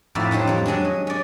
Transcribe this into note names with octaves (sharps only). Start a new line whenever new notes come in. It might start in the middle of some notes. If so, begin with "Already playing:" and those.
F2 A2 D#4 F#4 D5 E5
F#3 D4 D#4 G4 C5
F2 G3 C#5
F#3 G#3 C#4 D4
D#5
C#4 D5